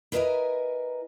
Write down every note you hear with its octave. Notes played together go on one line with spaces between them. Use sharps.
E4 A#4 B4 D#5 G#5 A#5